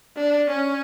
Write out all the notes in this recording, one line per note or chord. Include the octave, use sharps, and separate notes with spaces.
D4
C#4